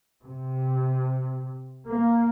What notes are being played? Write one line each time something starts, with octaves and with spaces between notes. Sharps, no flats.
C3
A#3